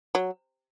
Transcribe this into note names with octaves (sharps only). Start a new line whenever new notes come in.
F#3